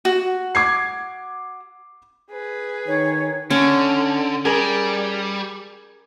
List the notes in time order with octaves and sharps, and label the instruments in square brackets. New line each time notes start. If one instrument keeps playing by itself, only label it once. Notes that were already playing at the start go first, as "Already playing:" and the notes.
[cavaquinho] F#4
[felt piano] D6 G#6 C7
[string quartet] G#4 B4
[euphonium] D#3 [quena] C#5
[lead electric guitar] D3 [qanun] C#4
[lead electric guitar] G3 [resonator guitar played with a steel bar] G#4 A#4